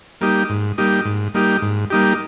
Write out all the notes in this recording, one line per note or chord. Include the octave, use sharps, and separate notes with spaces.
G3 A#3 D#4 G4
G#2
G3 A#3 D#4 G4
G#2
G3 A#3 D#4 G4
G#2
G3 A#3 D#4 G4